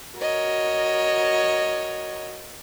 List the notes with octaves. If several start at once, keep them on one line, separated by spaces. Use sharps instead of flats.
F#4 A#4 C#5 D#5